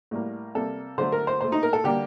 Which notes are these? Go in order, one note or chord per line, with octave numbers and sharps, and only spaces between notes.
A2 G3 A#3
C3 G3 A#3 A4
D3 F#3 A3 C5
A#4
C5
A#2 A3 C5
D#4
A#4
A4
D3 G3 A#3 G4